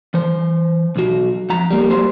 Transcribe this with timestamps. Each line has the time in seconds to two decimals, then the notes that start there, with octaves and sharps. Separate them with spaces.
0.14 E3 C5
0.96 B1 F#4
1.50 F2 F#5 A#5
1.71 G3 A#3
1.90 F#3 G3 A#3 C5